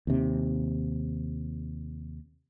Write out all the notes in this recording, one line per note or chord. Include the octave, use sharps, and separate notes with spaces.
D#2 C3